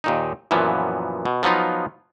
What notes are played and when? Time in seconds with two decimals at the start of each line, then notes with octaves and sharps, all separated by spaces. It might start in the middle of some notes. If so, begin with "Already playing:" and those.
0.04 D#2 A#2 D#4
0.51 F#2 A#2 E3 F3 B3
1.25 B2
1.43 F3 F#3 B3 D#4 F4